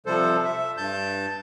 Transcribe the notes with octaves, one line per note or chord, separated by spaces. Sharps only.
C3 F3 G3 A4 C5
E5
G2 A5 G6